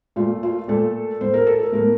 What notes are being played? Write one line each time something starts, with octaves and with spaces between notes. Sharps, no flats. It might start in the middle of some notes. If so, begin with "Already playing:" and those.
A#2 A3 F4
F4
A#2 A3 A4
A2 A3 C5
A#4
A4
A#4
A2 A3 A#4